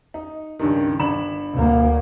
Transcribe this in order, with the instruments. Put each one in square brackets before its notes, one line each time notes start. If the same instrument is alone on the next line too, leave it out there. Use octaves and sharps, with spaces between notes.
[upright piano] D#4
C#2 G2 D#3
G1 B5 E7
[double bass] D2 A#3